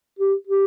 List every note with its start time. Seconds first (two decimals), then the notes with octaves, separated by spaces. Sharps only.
0.19 G4
0.47 G4